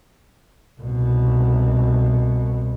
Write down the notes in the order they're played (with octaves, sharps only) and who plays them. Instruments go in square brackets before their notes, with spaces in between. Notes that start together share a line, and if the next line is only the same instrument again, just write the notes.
[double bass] C2 B2